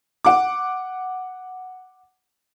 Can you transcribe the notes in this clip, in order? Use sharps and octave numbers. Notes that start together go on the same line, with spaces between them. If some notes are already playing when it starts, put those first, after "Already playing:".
F#5 D6